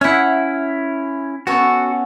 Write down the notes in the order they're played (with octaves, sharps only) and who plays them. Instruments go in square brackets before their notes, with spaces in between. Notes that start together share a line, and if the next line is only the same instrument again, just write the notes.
[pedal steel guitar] C#4 E4 [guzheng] E5 F#5
[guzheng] B3 C#4 A4 [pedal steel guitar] F#4